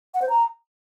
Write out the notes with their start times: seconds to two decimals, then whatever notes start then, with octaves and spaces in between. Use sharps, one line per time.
0.14 F#5
0.22 C5
0.29 A#5